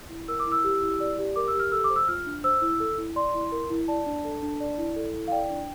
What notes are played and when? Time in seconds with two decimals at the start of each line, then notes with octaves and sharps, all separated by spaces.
0.09 E4
0.28 A#4 E6
0.39 D6
0.46 E4
0.52 E6
0.64 G4
0.82 E4
1.00 D5
1.18 G4
1.36 A#4 D6
1.48 E6
1.54 G4
1.59 F6
1.72 A4 E6
1.84 D6
1.90 C5
1.96 E6
2.08 F4 F6
2.26 D4
2.44 C5 E6
2.62 E4
2.80 A4
2.98 E4
3.16 D5 C6
3.34 E4
3.52 A#4
3.70 E4
3.88 D5 A5
4.06 D4
4.24 A4
4.42 D4
4.60 D5
4.78 E4
4.96 A4
5.14 E4
5.28 F5
5.32 D5 G5
5.50 D4